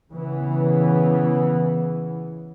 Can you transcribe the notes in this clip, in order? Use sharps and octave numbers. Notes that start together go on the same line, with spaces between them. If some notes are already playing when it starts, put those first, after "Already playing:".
C#3 E3 B3